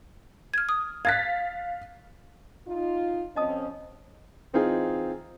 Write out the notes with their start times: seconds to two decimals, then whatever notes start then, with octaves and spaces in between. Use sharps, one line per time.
0.54 F6 G#6
0.69 D#6
1.05 F5 F#6 G#6 A6 B6
2.67 D#4 F4
3.36 F2 C4 C#4 D#5 A5 D#6
4.53 E3 C4 D#4 F4 G#4